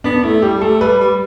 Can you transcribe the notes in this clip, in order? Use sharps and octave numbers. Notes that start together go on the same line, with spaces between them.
B3 D4
A3 E4
G3 G4
A3 A4
G3 B4
G3